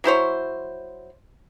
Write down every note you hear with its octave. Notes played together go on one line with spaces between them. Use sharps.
F#3 E4 C5 C#5